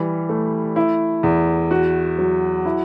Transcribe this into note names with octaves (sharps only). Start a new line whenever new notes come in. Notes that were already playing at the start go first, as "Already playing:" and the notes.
Already playing: E3 G3
A3
E4
E2
F#4
F#3
E4